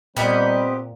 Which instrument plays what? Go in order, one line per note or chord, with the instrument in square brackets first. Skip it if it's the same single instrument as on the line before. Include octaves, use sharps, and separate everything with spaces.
[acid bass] A#2 [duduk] G3 [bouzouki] B3 G4 D#5 [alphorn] C4